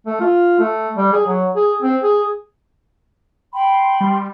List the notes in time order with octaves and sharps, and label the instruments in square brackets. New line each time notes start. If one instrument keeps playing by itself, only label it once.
[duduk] A3
F4
A3
G3
G#4
F#3
G#4
C4
G#4
[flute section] G5 B5 C6
[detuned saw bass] G3